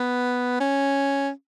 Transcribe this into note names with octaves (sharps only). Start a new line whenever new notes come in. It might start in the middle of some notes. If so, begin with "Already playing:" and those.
Already playing: B3
C#4